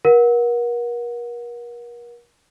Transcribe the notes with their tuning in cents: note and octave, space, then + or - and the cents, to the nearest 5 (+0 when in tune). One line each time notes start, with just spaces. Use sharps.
A#4 +35 F#5 -15